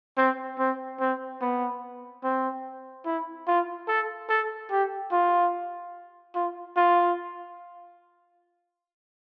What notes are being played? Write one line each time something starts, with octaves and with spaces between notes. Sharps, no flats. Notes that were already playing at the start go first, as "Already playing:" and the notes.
C4
C4
C4
B3
C4
E4
F4
A4
A4
G4
F4
F4
F4